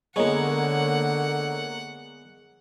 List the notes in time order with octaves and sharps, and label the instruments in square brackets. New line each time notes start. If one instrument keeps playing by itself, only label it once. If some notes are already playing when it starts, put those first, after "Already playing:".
[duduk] D3 [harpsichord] G#3 B3 [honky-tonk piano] A#3 C#5 [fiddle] F#5